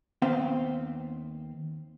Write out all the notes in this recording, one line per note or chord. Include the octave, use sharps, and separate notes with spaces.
D#2 B3 C4 C5 F5 G5